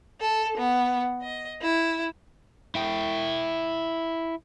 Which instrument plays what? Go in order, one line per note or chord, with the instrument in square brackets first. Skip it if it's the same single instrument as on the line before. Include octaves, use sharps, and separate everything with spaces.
[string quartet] A4
B3
D#5
E4
[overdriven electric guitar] E4 G5